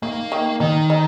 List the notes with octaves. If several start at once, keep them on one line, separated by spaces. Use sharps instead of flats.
D#3 A#3
D#3
D#3 D#4
D#4